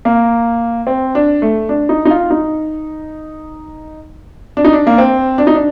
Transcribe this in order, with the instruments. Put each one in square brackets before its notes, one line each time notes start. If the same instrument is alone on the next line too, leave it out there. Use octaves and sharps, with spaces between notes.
[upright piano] A#3
C4
D4
A3
D4
D#4
D#4
F4
D#4
D4
D#4
D4
A#3
C4
D4
D#4
D4